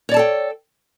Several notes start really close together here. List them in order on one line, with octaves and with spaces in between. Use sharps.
C#5 D5 A5 A4 G5